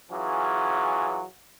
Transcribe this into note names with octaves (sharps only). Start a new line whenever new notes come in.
E3 F#3 C#4 F4 G#4